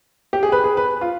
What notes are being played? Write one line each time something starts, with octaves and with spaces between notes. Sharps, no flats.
G4
G#4
B4
G#4
B4
F4